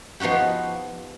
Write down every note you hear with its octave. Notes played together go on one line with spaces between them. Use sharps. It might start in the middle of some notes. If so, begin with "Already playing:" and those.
F3 B3 D#4 F#4 G4